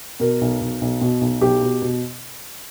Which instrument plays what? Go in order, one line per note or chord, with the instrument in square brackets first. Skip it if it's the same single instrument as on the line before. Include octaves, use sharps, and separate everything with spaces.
[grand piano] B2 A#4
B1
B1
B1
B2
B1
B1 G4
B2
B2